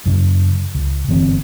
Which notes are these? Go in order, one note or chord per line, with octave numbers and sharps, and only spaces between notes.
F#2 C#3
C#2
G1 E3 B3 C4